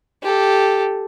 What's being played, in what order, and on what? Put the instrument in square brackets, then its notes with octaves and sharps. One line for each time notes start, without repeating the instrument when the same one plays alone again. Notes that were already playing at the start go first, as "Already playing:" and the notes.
[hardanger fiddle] G4 A4